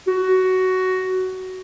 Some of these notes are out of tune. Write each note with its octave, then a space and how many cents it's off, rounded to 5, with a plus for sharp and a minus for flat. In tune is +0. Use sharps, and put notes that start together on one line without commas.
F#4 +10